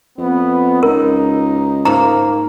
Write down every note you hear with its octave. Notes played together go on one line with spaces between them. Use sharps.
F2 B3
C#2 D#4 A#4
G#2 A3 A#3 A#5